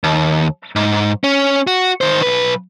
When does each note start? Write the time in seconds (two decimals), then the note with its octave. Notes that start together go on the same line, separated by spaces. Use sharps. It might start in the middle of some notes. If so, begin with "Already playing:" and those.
0.04 D#2
0.76 G#2
1.24 C#4
1.67 F#4
2.01 D#3 C5
2.22 B1 B4